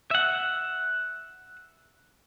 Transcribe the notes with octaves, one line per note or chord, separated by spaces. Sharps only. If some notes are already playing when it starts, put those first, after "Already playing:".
E5 F#5